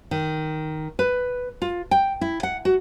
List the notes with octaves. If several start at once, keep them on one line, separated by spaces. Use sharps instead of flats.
D#3
B4
F4
G5
E4
F#5
F#4